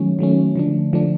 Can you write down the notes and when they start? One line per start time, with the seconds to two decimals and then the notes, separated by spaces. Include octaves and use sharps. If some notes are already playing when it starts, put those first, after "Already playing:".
Already playing: D#3 F#3 A3 C#4
0.19 D#3 F#3 A3 C#4
0.56 D3 F3 A3 D4
0.93 D3 F3 A3 D4